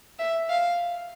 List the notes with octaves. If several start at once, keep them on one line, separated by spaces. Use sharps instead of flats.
E5
F5